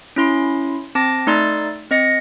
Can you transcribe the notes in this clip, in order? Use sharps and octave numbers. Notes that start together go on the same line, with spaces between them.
C#4 E4 C6
C4 A5 D6 A#6
A3 D#4 D5 C6 E6 A6
C4 D#5 A#6 C#7